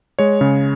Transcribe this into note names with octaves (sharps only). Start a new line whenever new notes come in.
G#3 C#5
C#3